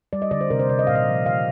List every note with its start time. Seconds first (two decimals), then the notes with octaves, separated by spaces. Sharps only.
0.13 G3 D5
0.22 D#5
0.31 D3 D5
0.41 C5
0.50 C3 A#4
0.59 C5
0.69 C3 D5
0.79 D#5
0.87 A#2 F5
0.95 D#5
1.08 F3
1.26 D#3 F5